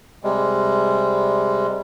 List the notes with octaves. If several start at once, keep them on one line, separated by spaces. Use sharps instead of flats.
C3 G3 G#3